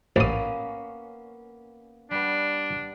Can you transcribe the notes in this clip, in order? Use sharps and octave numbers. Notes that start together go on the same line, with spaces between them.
A1 A#3 B3 C#4 D#6
G3 B3 D4